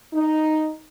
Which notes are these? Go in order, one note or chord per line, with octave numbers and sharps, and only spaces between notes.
D#4